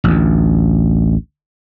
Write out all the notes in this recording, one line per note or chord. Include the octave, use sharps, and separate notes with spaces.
A1 D2